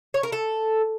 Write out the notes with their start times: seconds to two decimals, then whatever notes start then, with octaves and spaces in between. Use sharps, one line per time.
0.14 C#5
0.23 A#4
0.32 A4